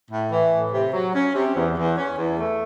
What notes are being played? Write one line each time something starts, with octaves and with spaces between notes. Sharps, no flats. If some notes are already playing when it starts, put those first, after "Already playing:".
A2
E3
A2
C3
F#3
C#4
C3
E2
E2
C#4
E2
A3